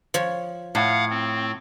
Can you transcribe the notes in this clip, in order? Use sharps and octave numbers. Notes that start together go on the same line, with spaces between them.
F3 C#5
A2 F5 F#5
C4